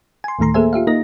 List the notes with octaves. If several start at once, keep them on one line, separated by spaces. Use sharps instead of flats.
G#5 C6
D2 A2 D#3 A3 A#5 C6
A#3 G#4 A4 C5 E5 G#5
F4 G4 E5 F5
A#3 D#4 A#4 D#5 A#6